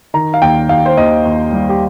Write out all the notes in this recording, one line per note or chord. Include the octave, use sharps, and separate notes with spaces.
D#3 A#5
F5
D#2 G5
D#2 F5
C5
D#2 D#5
D#2
G3
G4